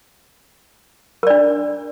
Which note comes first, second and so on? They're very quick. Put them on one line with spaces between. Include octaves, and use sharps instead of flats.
A#4 D5 D4